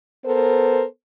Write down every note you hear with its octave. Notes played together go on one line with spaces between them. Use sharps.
B3 A4 A#4 C5